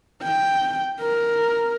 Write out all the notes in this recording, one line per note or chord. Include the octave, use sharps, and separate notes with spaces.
G5
A#4